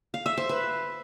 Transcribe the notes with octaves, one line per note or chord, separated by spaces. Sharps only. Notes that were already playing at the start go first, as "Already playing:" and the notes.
F5
E5
C5
B4